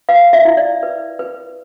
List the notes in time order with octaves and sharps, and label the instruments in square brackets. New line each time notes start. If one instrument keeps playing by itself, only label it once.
[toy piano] B4 F5
E5
E4
D5
B4
B4